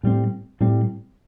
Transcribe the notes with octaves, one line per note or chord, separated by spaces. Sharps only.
A2 G3 C4
A2 G3 C4